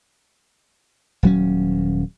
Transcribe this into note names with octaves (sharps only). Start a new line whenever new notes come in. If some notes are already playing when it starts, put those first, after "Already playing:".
D#1 F#3 C#4